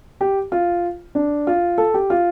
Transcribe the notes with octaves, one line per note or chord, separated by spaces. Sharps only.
G4
F4
D4
F4
A4
G4
F4